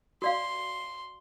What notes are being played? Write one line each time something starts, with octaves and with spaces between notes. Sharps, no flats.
F#4 D5 F5 C6